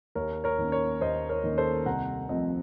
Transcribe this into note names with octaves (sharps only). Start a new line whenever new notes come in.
D#2 A#4 C#5
A#4 C#5
D#3 A#3 C#4
A#4 C#5
D#2 C5 D#5
A#4 C#5
D#3 A#3 C#4
A4 C5
C2 F#5 A#5
C3 F3 A3 C4 C5 D#5